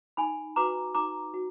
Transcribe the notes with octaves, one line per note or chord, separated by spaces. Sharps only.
D#4 G#5 B5
F#4 B4 A#5 D6
D#4 A#5 D6
F#4